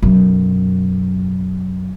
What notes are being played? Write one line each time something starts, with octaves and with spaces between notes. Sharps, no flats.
B1 F#2